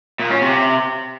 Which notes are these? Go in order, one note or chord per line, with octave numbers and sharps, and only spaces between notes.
A#2
C#4
C3